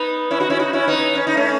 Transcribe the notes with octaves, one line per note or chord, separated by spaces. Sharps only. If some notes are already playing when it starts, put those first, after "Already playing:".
Already playing: B3 D#4
C#4 E4
D#4 F#4
C#4 E4
D#4 F#4
C#4 E4
B3 D#4
C#4
D#4
A3 C#4